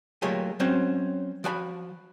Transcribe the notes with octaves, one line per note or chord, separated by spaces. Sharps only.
F#3 A3 A#3 F4 G4 G#4
F#3 C4 C#4 C5
F3 F#4 G5 B5